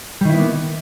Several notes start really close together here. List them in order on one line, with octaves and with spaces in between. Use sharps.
G3 D#3 E4 B3 A#3